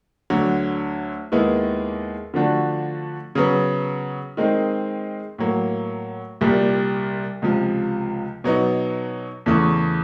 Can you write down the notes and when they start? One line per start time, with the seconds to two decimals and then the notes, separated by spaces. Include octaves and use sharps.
0.30 D2 D3 F#3
1.32 D#2 D#3 G#3 B3 E4
2.34 D3 F3 A3 D4 F#4
3.35 C#3 F#3 B3
4.37 D#3 G#3 C4 D#4
5.39 A2 F#3 A#3
6.41 C2 A#2 G3
7.42 C#2 C3 F3
8.44 B2 F#3 B3 D#4
9.46 E2 C#3 E3 A3